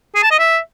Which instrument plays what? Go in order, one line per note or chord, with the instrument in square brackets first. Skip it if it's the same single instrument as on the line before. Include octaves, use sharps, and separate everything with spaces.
[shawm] G#4
A5
D#5
E5